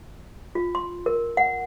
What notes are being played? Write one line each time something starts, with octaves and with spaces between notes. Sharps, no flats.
F4
C6
A#4
F#5